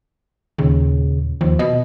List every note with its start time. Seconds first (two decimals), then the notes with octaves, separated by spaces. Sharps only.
0.58 D#2 A#2 C#3
1.41 D#2 F3
1.59 B2 D#5